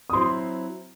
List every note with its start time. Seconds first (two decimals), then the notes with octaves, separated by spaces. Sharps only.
0.10 D#6
0.13 F#3 C4 E4 C6